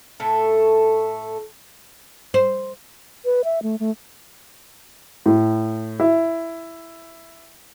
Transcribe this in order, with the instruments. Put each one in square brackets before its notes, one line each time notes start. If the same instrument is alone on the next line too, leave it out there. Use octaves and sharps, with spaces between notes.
[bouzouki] A2 A3 A4
[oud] C5
[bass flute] B4
E5
A3
A3
[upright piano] A2
E4